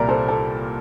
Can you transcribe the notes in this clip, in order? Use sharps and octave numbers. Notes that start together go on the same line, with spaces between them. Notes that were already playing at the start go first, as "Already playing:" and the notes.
Already playing: C2 A#2 G3 A#4 D5
A4 C5
A4